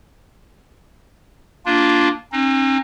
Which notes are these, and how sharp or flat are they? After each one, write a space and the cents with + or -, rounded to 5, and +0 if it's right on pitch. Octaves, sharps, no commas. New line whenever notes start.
A#3 +0 D4 +0 F4 +0
C4 +45 D#4 -35